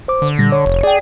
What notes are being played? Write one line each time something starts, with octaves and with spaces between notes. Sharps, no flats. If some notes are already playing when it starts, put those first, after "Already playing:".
C5 D6
D3
A#2 G3 A#6
C#5
F1
G#4 D5 G5